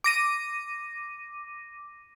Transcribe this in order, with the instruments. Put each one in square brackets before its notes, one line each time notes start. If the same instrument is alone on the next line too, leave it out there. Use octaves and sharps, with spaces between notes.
[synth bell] D6 A#6 D#7